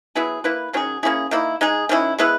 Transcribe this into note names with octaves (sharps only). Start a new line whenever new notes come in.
F#3 B3 E4 G#4
A#3 E4 B4
D#3 F#3 C#4 G#4
A#3 C#4 E4 G#4
D#3 A#3 E4
G#3 D#4 G#4
D#3 F#3 C#4 E4
G#3 B3 E4 B4